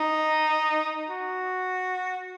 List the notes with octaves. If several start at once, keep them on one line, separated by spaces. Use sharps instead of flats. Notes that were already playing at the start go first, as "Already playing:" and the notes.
Already playing: D#4
F#4